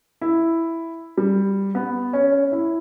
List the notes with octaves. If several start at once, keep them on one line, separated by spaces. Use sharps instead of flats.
E4
G3
B3
C#4
C#4
E4